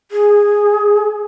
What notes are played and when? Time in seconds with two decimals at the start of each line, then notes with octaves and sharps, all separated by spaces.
0.11 G#4